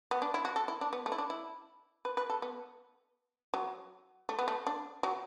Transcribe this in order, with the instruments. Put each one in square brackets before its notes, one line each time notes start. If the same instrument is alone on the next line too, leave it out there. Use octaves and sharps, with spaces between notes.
[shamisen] B3
D4
E4
F#4
A4
E4
D4
B3
A3
E4
D4
E4
B4
B4
A4
B3
F#3
A3
B3
A3
D4
F#3